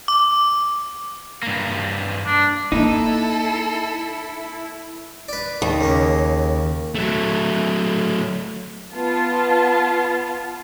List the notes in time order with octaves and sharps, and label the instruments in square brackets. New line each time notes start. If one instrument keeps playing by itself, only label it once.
[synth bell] D6
[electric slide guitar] G2 A#3
[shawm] D4
[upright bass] A#3 [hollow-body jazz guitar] D#4 [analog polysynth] E4 [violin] A4
[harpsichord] B4 D5
[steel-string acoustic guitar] D#2
[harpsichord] C#3 A#3
[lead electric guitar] F#3 A3
[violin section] B3 F4 A5